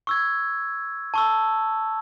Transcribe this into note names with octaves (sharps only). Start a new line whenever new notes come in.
C#6 E6 G#6
A5 C#6 E6